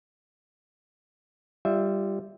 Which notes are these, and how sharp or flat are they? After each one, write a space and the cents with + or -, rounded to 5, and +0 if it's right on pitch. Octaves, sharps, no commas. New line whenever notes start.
G3 +0 F4 -20 E5 -15